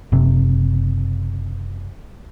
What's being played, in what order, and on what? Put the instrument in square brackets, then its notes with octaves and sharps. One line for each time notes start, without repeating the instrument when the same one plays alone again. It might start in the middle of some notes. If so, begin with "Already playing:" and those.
[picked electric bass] F#1 C3